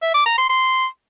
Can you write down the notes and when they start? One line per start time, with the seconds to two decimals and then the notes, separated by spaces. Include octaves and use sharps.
0.03 E5
0.14 D6
0.26 A#5
0.38 C6
0.50 C6